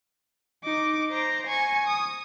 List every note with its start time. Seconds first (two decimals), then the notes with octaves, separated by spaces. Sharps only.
0.65 D#4 D6
1.10 C5 A#5
1.47 G#5 C#6
1.87 D#6